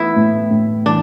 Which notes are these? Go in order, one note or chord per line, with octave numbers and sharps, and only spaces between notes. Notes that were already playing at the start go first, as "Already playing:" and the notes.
Already playing: E3 A3 B3 E4
A2
A2
E3 D4